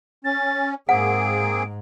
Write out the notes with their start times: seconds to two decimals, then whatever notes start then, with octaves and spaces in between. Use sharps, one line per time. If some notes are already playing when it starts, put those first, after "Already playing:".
0.25 C#4 A6
0.89 G#2 A#3 C4 G#4 F#5 D7